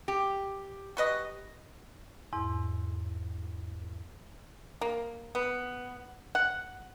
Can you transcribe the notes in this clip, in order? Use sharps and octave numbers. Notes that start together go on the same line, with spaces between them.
G4
F#4 B4 D#5
E2 G#2 E4
A#3
B3
F#5